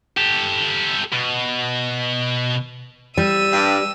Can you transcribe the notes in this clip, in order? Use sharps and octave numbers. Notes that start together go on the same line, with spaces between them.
G4 A4
B2
G3 E6 D#7
G2